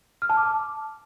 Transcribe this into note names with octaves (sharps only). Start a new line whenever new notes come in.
F6
A5
D6